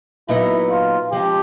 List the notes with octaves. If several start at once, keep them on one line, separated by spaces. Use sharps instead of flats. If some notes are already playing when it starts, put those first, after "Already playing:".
A#2 F#3 B3 D#4 E4
F4
F3 G#3 C#4 G4